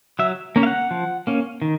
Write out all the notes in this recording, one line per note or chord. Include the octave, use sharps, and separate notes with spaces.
F#3 E5
A#3 C#4
F5
F#5
F3
A#3 C#4
D#3